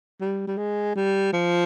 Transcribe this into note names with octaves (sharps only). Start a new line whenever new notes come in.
G3
G3
G#3
G3
F3